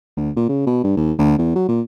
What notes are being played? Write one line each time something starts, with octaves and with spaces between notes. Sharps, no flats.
D2
A#2
C#3
B2
G2
D#2
D2
E2
F#3
A#2